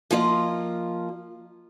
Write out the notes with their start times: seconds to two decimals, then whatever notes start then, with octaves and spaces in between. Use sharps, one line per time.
0.11 F3 A#3 F4 D#5